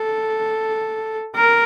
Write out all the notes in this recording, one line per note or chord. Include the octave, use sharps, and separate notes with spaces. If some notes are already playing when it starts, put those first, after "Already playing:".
Already playing: A4
A#4